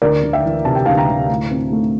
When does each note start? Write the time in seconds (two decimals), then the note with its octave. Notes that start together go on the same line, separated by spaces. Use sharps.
0.02 D2 A#4 D5
0.23 D2
0.33 E5 G5
0.45 E3
0.65 C3 A5
0.75 G5
0.85 D2 F5 A5
0.97 G5 A#5
1.09 D2
1.29 A2
1.51 C4
1.72 A3